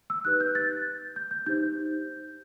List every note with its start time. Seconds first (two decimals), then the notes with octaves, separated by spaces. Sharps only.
0.10 E6
0.25 D#4 G4 B4 F#6
0.40 G6
0.55 A6
1.16 G6
1.31 G6
1.46 D#4 G4 C5 G6